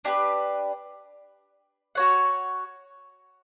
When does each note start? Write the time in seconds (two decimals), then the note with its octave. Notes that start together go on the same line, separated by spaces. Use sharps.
0.05 D4 G4 B4
1.95 F#4 C#5 F#5